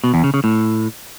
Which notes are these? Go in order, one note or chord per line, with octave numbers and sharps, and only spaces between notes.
B2
E2
C#3
C#3
A2